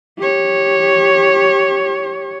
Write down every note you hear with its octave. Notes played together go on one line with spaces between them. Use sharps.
G4 C#5